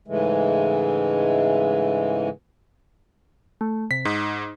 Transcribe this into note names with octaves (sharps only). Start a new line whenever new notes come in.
G#2 C#3 E3 G#3 A3
A3
C3 B6
G#2 D#4